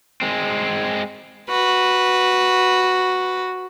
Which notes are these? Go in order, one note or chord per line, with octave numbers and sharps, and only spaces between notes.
G#3 C4
F#4 B4